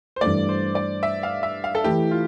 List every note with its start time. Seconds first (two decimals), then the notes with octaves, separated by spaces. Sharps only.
0.16 C5
0.21 G2 E3 A3 D5
0.49 C5
0.75 D5
1.03 E5
1.23 F5
1.43 E5
1.64 F5
1.75 A4
1.84 E3 A3 E4 G4
2.11 F4